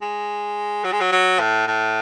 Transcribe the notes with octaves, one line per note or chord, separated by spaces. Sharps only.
G#3
F#3
G#3
F#3
F#3
A2
A2